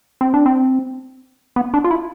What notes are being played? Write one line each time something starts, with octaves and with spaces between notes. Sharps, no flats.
C4
D4
C4
B3
D4
F4
E4